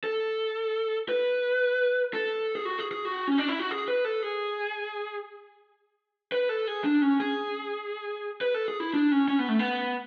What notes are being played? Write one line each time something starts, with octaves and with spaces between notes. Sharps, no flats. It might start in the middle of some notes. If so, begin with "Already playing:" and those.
A4
B4
A4
G#4
F#4
G#4
G#4
F#4
C#4
D4
E4
F#4
G#4
B4
A4
G#4
B4
A4
G#4
D4
C#4
G#4
B4
A4
G#4
E4
D4
C#4
C#4
B3
A3
B3